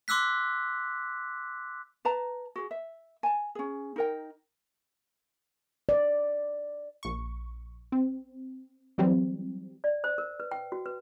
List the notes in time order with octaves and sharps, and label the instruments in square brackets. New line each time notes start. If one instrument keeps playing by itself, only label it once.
[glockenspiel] C6 D6 E6 F#6 B6
[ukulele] B4 A5 A#5
F#4 G#4
E5
G#5 A5
C#4 G#4
D#4 A#4 G5
[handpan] D5
[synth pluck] A#1 C#6
C4
E3 F#3 G3 C4
[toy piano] D5
C5
A#4
B4
G5
F#4
B4